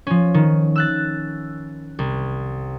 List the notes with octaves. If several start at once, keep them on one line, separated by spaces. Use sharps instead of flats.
F3 C#4
D#3
E6 F#6 A6
C2